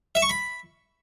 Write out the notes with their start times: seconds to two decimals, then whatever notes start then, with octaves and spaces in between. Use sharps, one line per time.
0.15 E5
0.22 C#6
0.29 B5